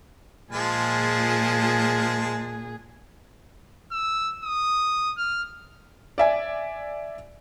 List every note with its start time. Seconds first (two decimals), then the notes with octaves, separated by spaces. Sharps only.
0.53 A#2 F3 G#3 G#4 A5
3.92 E6
4.44 D#6
5.17 F6
6.18 D5 E5 G#5